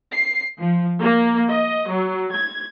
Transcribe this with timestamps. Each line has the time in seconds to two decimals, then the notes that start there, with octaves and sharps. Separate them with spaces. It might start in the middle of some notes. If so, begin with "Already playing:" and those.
0.11 C7
0.59 F3
1.01 A#3
1.50 D#5
1.90 F#3
2.34 G#6